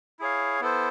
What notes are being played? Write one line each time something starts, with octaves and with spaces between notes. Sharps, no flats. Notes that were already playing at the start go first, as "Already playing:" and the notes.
E4 G#4 C#5 F5
B3 E4 A4 C5